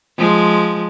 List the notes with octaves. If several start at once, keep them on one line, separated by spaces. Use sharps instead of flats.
F3 G#3